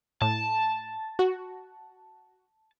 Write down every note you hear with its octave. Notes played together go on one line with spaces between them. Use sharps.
A2 A5
F#4